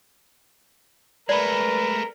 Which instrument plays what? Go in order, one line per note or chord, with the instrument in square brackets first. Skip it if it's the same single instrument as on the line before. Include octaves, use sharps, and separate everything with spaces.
[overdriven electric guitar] G#3 A3 [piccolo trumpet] A#4 [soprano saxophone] B4 [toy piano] D5 B5